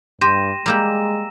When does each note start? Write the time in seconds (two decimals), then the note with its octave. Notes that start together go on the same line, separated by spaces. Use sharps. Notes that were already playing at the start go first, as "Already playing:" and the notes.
0.21 G2 G4 C6 A#6 D#7 E7
0.66 G3 G#3 A#3 G4 A#5 E6 E7